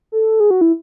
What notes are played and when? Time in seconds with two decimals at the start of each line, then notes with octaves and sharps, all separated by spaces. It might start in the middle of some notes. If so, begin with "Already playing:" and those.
0.12 A4
0.40 G#4
0.51 F#4
0.61 E4